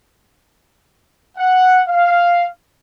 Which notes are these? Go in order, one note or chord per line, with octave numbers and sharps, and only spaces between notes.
F#5
F5